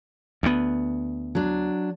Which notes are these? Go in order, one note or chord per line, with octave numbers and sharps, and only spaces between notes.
D2 B3
F#3 D4